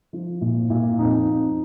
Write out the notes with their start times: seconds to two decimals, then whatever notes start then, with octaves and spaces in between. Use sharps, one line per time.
0.13 F3
0.41 A#2
0.70 A#2
0.99 F2 D#4
1.28 F2